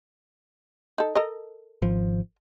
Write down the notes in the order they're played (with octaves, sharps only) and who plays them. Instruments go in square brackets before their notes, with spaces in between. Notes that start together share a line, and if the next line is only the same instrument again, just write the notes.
[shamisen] D#4 A4
A4 A#4 D#5
[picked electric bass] G#1 F3